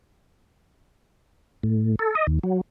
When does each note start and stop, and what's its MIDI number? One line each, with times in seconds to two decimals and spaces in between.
1.63 1.95 45
1.99 2.15 69
2.15 2.27 75
2.27 2.39 39
2.43 2.61 54